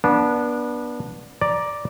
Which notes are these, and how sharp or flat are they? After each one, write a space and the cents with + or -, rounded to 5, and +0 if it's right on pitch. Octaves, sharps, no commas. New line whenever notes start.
B3 -30 D4 +0
D5 +0 A#5 +15